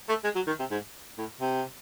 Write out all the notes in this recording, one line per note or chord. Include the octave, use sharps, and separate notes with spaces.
A3
G#3
F#3
D#3
C3
G#2
A2
C3